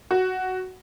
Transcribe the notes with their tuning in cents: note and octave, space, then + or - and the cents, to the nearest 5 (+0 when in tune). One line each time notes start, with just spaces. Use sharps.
F#4 +5